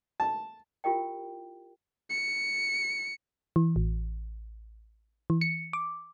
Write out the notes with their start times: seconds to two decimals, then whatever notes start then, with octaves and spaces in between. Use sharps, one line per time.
0.20 A5
0.84 E4 F4 G4 A#4 D#5 G5
2.10 C#7
3.56 E3
3.76 A1
5.30 E3
5.41 C#7
5.73 D6